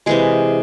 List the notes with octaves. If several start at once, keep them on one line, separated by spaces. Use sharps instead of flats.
C3 E3 G#3 G#4